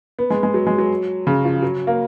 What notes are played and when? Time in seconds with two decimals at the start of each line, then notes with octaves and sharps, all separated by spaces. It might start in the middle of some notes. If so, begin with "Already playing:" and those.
0.19 B3
0.30 G#3
0.43 G#3
0.54 F#3
0.67 G#3
0.78 F#3
1.27 C#3
1.44 F3
1.63 F#3
1.87 A#3